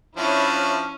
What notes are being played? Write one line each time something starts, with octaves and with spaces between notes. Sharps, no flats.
F3 C#4 D4 E4 C#5